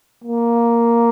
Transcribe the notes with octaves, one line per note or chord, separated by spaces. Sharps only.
A#3